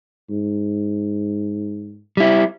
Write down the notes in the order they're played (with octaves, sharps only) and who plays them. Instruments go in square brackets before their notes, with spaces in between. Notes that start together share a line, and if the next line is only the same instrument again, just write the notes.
[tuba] G#2
[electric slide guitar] G3 E4